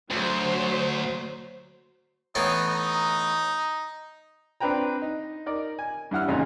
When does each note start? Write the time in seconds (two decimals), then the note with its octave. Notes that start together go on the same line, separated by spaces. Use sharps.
0.11 D2 F#3 C5
2.35 A2 E3 B3 D#4
2.68 D#4
4.60 C4 D4 B4 G5 A#5
5.02 D#4
5.46 D#4 A#4 D5
5.79 G#5
6.11 G2 E4 F#5 F6
6.28 A1 A#2 C#3 D#4 A#5